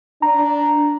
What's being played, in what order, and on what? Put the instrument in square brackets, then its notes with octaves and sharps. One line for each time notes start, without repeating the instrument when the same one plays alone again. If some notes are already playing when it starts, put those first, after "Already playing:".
[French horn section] D4 [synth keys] A#5